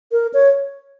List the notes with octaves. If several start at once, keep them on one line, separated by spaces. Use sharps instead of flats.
A#4
C#5